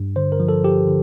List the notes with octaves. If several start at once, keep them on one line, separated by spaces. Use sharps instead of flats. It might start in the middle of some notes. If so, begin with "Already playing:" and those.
Already playing: G2
D3 C5
A#4
F3
A4
F3 G4
D3